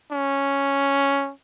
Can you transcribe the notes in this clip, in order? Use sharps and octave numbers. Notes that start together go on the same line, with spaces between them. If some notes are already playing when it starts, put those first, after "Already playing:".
C#4